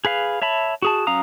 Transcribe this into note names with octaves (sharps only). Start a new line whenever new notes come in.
G#4 B4 F5
C#5 E5 A5 B5
F#4 G#4 A5
F#3 C#4 F5 A#5 D#6